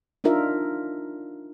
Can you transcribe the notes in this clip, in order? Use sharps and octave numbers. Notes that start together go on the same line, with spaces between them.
D4 D#4 F4 A#4 E5